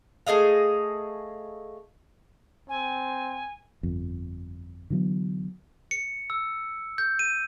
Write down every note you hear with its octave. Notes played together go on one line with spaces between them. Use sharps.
A3 G#4 D#5 F5
C4 G#5
G1 F2
D3 E3 F#3 B3
C#7
E6
G6
D#7